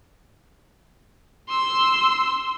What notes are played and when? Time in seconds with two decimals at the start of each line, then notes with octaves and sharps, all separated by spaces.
1.49 C6 E6